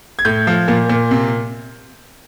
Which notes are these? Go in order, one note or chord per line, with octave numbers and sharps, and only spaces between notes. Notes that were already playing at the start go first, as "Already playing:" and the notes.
G#6
A2 G6
F3
A#2
A#2
C3